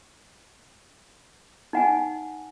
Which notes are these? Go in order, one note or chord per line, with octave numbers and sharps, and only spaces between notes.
D#4 F#5 G#5